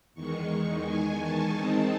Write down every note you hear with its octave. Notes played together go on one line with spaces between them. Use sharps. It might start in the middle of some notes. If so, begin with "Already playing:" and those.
E2 D#3 G#3 C#6
G#5
A5
D#3 G#3 C4 D#4 A5